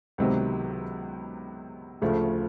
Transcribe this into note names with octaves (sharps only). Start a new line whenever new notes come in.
C#2 C3 D#3 F#3 B3
D2 C#3 F3 A3